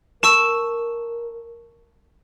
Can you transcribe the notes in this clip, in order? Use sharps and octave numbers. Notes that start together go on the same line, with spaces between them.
A#4 A5 C#6 E6 E7